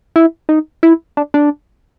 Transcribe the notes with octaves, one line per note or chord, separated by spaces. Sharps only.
E4
D#4
E4
D4
D4